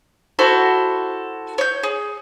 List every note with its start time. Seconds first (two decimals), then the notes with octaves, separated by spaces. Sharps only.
0.39 E4 F#4 A4 C5
1.58 C#5 G6
1.83 G#4